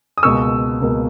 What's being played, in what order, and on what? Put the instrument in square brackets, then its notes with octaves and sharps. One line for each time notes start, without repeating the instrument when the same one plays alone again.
[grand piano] D#6
C#2 B2 A#3 C#6 E6
C#2 B2 A#3